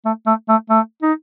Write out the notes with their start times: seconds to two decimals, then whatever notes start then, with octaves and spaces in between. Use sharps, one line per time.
0.05 A3
0.26 A3
0.49 A3
0.70 A3
1.03 D#4